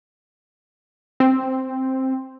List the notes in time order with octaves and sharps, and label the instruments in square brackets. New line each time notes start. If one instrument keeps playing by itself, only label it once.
[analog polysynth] C4